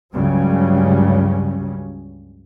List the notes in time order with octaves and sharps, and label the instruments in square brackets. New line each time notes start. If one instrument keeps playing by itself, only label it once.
[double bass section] C#2 G2 C#3 F#3 G3 C#4